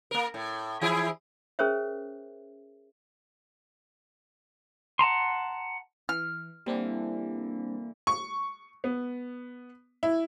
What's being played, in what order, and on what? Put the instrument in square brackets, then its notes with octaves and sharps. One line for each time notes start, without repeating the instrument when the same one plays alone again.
[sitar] A#3 A#4
A2
E3 E4 G#4
[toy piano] C#4 G#4 A#4 C5 C#5 E5
[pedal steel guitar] F#5 A5 A#5 C6
[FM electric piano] E3 [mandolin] F6
[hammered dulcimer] D3 E3 [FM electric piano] G3 C4 D4 [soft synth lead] A#3
[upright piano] C#6
B3
E4